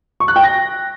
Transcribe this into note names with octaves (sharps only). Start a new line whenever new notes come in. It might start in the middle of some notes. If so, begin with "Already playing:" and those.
C#6
F#6
G5
A#6